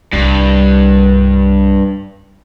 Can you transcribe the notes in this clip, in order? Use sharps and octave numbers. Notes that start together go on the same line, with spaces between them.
C2 G2 E4